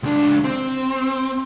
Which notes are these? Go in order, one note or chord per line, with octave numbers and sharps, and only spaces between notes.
C#2 D4
C4